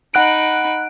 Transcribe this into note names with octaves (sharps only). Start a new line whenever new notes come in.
D#4 F#5 B5 F#6 D7